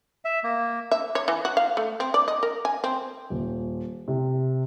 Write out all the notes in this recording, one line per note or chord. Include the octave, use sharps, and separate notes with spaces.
E5
A#3
E5
C#5
E3
F#4
F5
A3
C4
D5
D#5
A#4
G#5
C4
D#1
C3